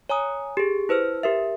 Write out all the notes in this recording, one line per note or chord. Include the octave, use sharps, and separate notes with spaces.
C#5 G#5 A#5 D#6
G4 G#4
E4 B4 C5 F6
G4 A#4 E5